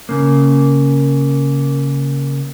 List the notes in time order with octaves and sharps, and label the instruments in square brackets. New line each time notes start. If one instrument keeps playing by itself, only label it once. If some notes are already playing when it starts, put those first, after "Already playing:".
[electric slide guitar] C#3 A#3